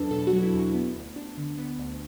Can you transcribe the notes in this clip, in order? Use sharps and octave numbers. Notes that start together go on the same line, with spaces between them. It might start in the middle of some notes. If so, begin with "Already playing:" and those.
Already playing: E2 F#3 D4 A4 B4
B2 A4
F#4
F#3
E4
E2
F#4
B3
D2
D4
D3
B3
D2